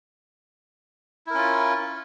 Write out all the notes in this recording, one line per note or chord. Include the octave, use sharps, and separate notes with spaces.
C#4 E4 F4 A#4